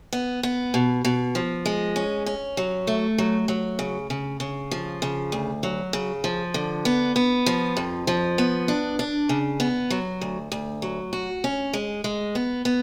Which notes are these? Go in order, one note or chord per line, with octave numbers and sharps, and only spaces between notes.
B3
B3
B2
B2
F3
G#3
C#4
C#4
F#3
A3
F#3
F#3
C#3
C#3
C#3
F3
C#3
D2
F#3
C#3
F3
D3
B3
B3
F3
F2
F3
B3
D4
D4
C#3
B3
F#3
D2
D2
F#3
F#4
C#4
G#3
G#3
B3
B3